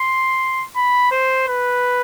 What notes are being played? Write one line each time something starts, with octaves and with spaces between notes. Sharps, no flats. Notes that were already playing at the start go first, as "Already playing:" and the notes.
Already playing: C6
B5
C5
B4